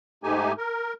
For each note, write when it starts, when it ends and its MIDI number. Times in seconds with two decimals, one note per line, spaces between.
0.24 0.52 44
0.24 0.52 57
0.24 0.52 63
0.24 0.52 67
0.24 0.52 80
0.58 0.93 70